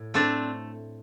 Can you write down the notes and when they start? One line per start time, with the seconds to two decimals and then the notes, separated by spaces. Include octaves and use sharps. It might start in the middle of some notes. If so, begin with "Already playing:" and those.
Already playing: A2
0.14 A3 C4 D4